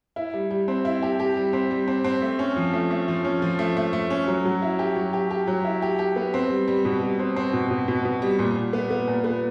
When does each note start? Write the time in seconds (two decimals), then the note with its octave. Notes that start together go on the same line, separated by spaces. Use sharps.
0.16 E4
0.34 G3
0.51 G3
0.68 C4
0.85 E4
1.02 G4
1.20 G4
1.37 G3
1.53 C4
1.71 G3
1.88 C4
2.04 C4
2.22 A3
2.39 C#4
2.56 F3
2.74 A3
2.91 A3
3.08 F3
3.25 C#4
3.42 F3
3.59 A3
3.77 A3
3.93 A3
4.10 C#4
4.28 F#3
4.45 F#3
4.62 E4
4.79 G4
4.96 F#3
5.13 G4
5.31 G4
5.47 F#3
5.65 E4
5.82 G4
5.99 G4
6.16 B3
6.34 C4
6.50 G3
6.68 G3
6.85 B2
7.02 G3
7.19 C4
7.36 C4
7.53 B2
7.71 B2
7.88 B2
8.05 B2
8.22 G3
8.39 A#2
8.56 A#2
8.73 B3
8.91 B3
9.08 A#2
9.24 B3